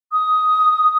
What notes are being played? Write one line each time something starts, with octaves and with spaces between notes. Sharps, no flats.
D#6